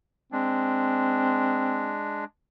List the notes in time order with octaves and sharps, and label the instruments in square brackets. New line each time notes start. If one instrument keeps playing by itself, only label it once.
[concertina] G#3 D4 [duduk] C4